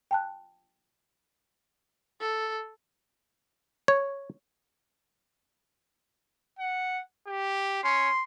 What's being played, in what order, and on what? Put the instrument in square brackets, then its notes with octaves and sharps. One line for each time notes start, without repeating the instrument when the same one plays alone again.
[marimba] G5 A5 F#6
[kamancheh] A4
[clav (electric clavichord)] C#5
[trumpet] F#5
G4
[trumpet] C#4 [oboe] C6